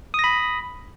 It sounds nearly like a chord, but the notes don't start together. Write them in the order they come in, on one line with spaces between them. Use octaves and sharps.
D#6 A#6 B5